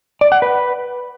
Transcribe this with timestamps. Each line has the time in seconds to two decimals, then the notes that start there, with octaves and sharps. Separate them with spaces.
0.21 D5
0.32 F#5
0.42 B4